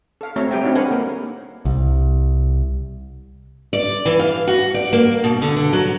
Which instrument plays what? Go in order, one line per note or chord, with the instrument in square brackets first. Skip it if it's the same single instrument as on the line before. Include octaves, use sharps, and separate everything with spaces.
[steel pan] A4 F5
A3 C4 F#4 C#5 E5 A#5
G3 G4 E5 G5 G#5
C4 D4 D#4 F#4 C#5
A4 B4 F5 F#5 G#5
A#3 A#4
[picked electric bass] C2
[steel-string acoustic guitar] D5
E3
F5
F#4
D5
A#3
B2
D3
D3
F#3